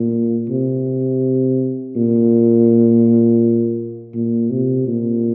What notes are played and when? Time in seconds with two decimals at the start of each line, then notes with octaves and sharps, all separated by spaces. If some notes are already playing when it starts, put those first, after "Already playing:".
Already playing: A#2
0.49 C3
1.96 A#2
4.14 A#2
4.50 C3
4.87 A#2